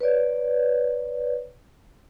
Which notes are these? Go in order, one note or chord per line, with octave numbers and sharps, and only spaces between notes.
B4 C#5 D5